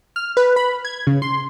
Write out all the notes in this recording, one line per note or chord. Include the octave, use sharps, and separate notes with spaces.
F6
B4
B5
G#6
C#3
C6